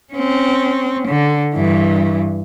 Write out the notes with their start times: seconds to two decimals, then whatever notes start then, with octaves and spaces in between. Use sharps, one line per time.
0.13 C4 C#4
1.07 D3
1.54 G2 E3